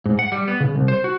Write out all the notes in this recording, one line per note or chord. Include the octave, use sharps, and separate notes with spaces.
G#2
F#5
G3
B3
C#3
C2
C5
F#4